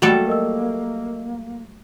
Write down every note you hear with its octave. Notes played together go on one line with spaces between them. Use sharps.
F#3 G3 A3 A#3 F#4 A4
A#4 D#5 E6